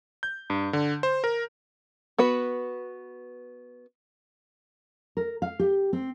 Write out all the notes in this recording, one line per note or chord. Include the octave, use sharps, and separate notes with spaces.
G6
G2
D3
C5
A#4
B3 F#4 B4
A#4
F5
G4
C4